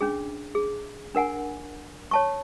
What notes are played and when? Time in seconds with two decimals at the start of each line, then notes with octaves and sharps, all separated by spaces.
0.01 C#4 D4 G#4
0.55 G#4
1.15 D4 A#4 F#5 G#5
2.11 C#5 A5 C#6